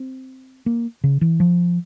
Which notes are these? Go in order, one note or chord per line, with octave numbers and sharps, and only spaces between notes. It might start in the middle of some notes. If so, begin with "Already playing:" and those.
Already playing: C4
A#3
C#3
E3
F3